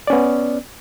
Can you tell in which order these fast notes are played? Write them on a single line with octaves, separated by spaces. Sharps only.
D5 C#4 B3